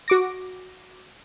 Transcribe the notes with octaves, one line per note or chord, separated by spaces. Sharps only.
F#4 D6 A#6